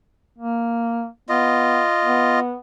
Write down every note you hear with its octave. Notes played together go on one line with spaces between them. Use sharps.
A#3
B3 F4 D#5
B3